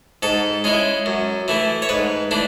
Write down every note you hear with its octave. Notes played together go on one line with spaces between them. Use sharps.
G#2 A4
G#3 C#4 E4
F#2
E3 A3 E4
C#5
G#2 B4
E3 A3 D4